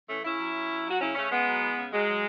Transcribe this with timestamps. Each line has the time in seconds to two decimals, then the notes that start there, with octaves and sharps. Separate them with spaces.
0.09 E3 A3 C#4
0.24 C#3 C#4 E4
0.39 F#3
0.54 F#3
0.70 F#3
0.85 F#3 F#4
1.00 C#3 C#4 E4
1.15 C#3 A3 C#4
1.30 C#3 G#3 B3
1.46 F#3
1.61 E3
1.77 C#3
1.91 F#3 G#3
2.08 F#3